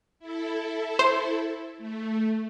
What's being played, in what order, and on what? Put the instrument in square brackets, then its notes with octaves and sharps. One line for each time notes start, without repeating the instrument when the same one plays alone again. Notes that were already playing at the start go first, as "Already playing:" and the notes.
[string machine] E4 A4
[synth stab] C5
[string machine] A3